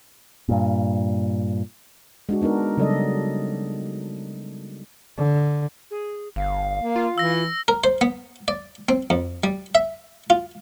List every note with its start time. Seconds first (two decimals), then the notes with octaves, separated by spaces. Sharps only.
0.49 G2 A#2
2.29 G#3 D4 F#4
2.42 B3 D4 D#4 A#4
2.77 C#3 F#3 G3 A4 D5 D#5
5.17 D3
5.91 G#4
6.36 G1 F5
6.77 A#3
6.96 F4
7.18 E3 E6 A#6
7.68 A#4
7.84 C5
8.01 B3
8.48 D5
8.89 C4
9.10 F2
9.44 G3
9.75 E5
10.30 F4